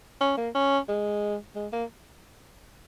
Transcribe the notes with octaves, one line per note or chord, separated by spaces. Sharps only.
C#4
A#3
C#4
G#3
G#3
A#3